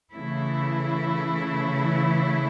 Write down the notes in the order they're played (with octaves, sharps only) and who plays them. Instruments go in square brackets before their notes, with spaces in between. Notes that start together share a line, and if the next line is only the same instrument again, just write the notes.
[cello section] C#3 E3 A3 E4